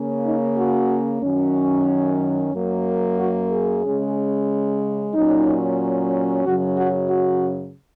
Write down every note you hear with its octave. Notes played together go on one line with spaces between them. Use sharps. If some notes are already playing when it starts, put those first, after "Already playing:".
Already playing: C#3 A#3 C#4
D#4
F#4
F#2 D#3 F#3 C#4
F#2 F#3 A#3
F#4
G#4
C#3 G#3 C#4
A#2 F#3 C#4 D#4
F#2 C#3 F#3 C#4 F#4
F#4
F#4